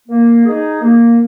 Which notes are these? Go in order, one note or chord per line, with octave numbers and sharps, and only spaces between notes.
A#3
D#4 G#4
A#3